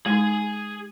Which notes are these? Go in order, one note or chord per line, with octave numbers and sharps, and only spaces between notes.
G#3 D#4 G#4 G#5